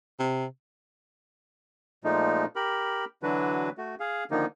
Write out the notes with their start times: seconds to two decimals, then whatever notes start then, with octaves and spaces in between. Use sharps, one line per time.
0.20 C3
2.04 A#2 F3 G#3 A3 D#4
2.56 G4 A#4 B5
3.23 D3 E3 F#3 D4 F#4 B4
3.78 A3 F#4
4.00 G#4 F5
4.31 D3 D#3 F3 A#3 D#4